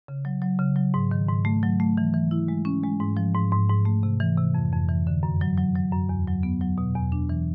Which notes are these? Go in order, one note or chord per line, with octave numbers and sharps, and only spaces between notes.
C#3
F#3
F#3
C#3
F#3
G#2
D#3
G#2
A3
F#3
A3
E3
E3
E4
G#3
C#4
G#3
G#2
F3
G#2
G#2
G#2
A3
C3
E3
C3
F2
F2
E3
D3
F#2
F#3
F#3
F#3
F#2
E2
F#3
B3
F#3
B2
E2
D4
E3